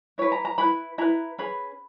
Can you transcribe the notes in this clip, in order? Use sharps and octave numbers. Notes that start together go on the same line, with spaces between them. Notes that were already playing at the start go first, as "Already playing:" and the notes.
E4 B4 C#5
A#5
A#5
E4 B4 B5
E4 B4 A#5
C#4 G#4 B4 B5